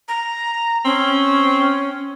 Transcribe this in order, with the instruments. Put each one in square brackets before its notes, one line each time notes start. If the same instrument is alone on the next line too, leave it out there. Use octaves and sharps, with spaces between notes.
[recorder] A#5
[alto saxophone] C4 [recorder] C#4